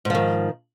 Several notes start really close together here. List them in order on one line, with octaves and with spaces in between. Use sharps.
G#2 F3 D#3